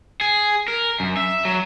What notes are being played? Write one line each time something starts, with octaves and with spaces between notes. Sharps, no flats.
G#4
A#4
F#2
E5
F#3